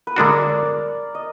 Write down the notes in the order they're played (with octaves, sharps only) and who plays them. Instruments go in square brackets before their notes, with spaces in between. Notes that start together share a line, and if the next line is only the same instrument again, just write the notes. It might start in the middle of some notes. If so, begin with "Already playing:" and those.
[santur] B4
[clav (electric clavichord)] D3 G#3 D4 F#4 [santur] A#4
[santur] D5
D5
D5
D#5